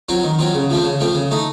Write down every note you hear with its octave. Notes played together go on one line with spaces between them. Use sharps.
F#3 C4 F4
D#3
F#3 C4 F4
C#3
F3 A3 C4
C#3
F3 A3 C4
C#3
A3 D#4